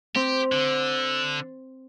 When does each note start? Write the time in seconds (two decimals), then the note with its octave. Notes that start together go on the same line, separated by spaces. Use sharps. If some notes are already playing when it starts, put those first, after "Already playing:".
0.15 C4 G4
0.52 D3